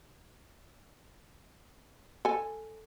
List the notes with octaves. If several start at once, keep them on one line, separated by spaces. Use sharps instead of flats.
A4 G#5